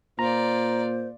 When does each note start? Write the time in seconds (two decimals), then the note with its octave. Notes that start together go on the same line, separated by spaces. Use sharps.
0.19 A#2 F4 C5 D5 A#5